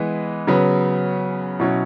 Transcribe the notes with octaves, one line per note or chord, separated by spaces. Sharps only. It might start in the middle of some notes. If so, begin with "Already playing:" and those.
Already playing: E3 G#3 B3
C#3 F#3 B3
B2 F#3 C#4 E4